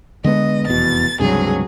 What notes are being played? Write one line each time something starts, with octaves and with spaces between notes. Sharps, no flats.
D3 G#3 B3 D#5
F1 E2 B2 A6
C#2 G2 C3 F#3 G#4